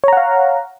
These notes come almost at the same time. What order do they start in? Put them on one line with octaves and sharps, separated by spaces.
C#5 A#5 F#5 F5